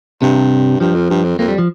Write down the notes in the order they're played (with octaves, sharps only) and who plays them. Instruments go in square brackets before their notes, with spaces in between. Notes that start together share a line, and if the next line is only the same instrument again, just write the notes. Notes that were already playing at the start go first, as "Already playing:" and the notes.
[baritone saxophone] G2 [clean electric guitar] C3
[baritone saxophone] G2 [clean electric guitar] F3
[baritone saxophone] F2
G2
F2
[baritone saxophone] F2 [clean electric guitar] A#3
[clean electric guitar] G3
F3